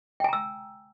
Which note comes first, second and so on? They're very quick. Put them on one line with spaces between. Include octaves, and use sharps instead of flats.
G5 G#5 A#5 E6